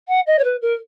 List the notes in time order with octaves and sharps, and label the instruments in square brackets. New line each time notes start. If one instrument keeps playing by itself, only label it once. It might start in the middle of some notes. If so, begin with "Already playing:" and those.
[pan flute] F#5
D#5
C#5
B4
A#4